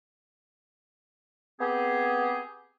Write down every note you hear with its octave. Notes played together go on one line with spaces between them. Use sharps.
B3 C4 G4 G#4